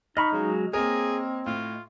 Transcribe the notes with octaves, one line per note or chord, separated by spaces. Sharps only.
D#4 D#5 B5 C#6 F6
C#3 F#3 G#3
A#3 C4 G#4 A#4 C#5 D#5
A2 F4